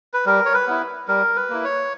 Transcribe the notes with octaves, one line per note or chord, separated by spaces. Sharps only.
B4
G3 A#4
C#5
B4
B3 E4
G3 A#4
B4
A#3 E4
C#5